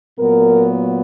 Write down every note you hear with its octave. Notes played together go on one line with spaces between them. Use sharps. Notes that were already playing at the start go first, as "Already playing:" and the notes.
A#2 F#3 B3 A#4